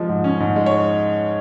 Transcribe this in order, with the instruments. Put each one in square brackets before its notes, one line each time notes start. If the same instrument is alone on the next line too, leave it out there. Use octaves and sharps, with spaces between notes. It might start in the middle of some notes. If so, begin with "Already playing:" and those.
Already playing: [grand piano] F3 G#3
G#2
C#4
G#2
G#3
C#5